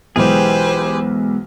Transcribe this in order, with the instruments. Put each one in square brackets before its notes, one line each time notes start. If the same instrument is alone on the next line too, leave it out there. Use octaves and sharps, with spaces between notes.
[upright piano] B1 E3 [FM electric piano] G#3 B3 [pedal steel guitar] G4 G#4 [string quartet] B4 C5